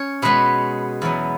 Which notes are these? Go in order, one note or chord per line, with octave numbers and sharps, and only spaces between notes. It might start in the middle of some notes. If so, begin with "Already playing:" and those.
Already playing: C#4 C#5
B2 G#3 B3 B4
E2 B2 F#3 B3